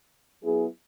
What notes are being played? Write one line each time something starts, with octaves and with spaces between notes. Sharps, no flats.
F#3 B3 E4 G#4